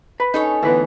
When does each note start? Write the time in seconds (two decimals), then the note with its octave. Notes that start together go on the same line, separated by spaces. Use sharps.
0.20 B4 B5
0.34 C#4 D#4 A4 C#5
0.63 D2 E3 B3 B4